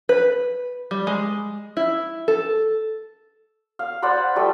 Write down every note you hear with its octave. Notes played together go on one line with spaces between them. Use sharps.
B4
G3
G#3
E4
A4
F5
C5 D5 F#5 B5
F3 G3 A3 G5